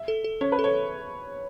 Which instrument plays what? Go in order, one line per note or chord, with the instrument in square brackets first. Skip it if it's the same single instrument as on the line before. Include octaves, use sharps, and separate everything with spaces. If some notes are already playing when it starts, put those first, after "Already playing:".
Already playing: [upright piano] E5
[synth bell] A4
A4
[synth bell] C#4 [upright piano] C#5
[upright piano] B4
[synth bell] A4
[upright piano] C#5